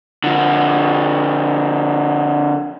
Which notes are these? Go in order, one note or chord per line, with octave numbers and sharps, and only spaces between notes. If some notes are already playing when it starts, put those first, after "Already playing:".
D3 F3